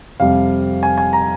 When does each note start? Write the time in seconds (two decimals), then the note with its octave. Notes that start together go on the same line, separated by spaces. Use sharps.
0.20 F2 C3 G3 F5
0.83 G#5
0.98 G#5
1.13 A#5